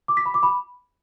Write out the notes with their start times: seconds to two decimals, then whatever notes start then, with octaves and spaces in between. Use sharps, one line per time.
0.08 D6
0.17 B6
0.26 B5
0.34 D6
0.43 B5